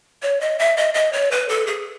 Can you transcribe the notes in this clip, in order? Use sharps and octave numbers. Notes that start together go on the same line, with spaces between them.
C#5
D#5
E5
D#5
D#5
C#5
B4
A4
G#4